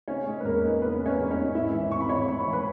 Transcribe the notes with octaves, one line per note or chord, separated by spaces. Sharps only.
C#3 C#4 C#5
G#3
B4
E2 A#3 A#4
D#4
C#3 B3 B4
G#3
C#4 C#5
E2
C#4 C#5
D#4
G#2 E4 E5
E3
G#1 C#6
B5
G#1 C#5 C#6
G#2 B5
C#6
E3
B4 B5